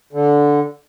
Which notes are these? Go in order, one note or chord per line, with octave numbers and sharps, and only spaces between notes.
D3